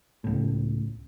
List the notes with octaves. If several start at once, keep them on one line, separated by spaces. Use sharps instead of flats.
C#2 A2